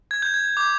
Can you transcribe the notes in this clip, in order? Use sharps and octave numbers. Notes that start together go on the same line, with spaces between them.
G#6
G6
G#6
D6 G6